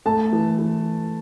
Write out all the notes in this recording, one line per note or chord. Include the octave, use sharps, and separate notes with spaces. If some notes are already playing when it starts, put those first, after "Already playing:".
A3 A5
E3
E3